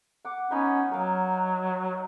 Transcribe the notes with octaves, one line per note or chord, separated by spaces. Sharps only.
F#5 D6
B3 C#4 D#4 B4
F#3 A#4 F5